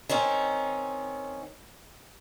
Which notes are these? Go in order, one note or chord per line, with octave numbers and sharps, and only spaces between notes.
D#3 C4 C#4 D#4